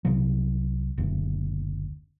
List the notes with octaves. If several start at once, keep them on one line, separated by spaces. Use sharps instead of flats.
C2 C3 F#3
F#1 D2